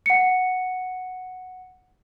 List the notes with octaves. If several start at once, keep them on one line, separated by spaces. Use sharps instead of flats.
F#5 C#7